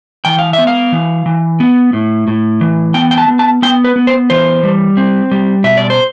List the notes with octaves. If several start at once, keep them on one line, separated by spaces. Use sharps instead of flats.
E3 G5
F5
E5
B3
F5
E3
E3
B3
A2
A2
E3
B3 G5
G5
A5
B3
A5
B3 G5
B4
B3
C5
E3 C5
G3
C4
G3
B2 E5
D5
C5